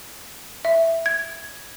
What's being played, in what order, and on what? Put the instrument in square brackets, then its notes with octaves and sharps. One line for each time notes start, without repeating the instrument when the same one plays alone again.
[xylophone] E5
G#6